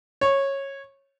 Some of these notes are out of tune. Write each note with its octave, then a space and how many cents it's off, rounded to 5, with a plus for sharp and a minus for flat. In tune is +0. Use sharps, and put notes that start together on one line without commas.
C#5 -15